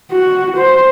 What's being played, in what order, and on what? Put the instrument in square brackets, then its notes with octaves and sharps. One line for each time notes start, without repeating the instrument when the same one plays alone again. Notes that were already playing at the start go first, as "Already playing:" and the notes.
[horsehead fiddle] F#4
C5